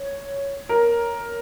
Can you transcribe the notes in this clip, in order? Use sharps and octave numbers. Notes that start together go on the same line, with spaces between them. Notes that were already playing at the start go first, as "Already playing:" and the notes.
Already playing: C#5
A#4